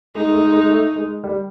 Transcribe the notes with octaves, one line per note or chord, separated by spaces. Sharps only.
G#3 D#4
A3
G#3
G#3
A3
G#3
G3